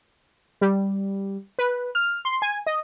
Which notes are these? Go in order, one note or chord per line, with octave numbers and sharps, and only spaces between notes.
G3
B4
F6
C6
G#5
D#5